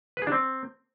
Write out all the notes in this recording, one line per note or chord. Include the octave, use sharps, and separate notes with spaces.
B4
G#4
D4
C4